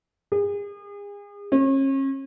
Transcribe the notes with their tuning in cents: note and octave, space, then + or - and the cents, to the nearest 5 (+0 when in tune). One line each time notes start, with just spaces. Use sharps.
G#4 -40
C#4 -40